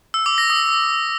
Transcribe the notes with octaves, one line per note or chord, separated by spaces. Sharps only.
E6
D6
A#6
D#6